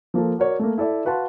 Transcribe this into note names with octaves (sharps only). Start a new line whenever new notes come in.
F3 A#3 F4 A4
F#4 A#4 C#5 D5
A3 A#3
E4 A4 D5 E5
F#4 B4 F5 F#5 A5 C6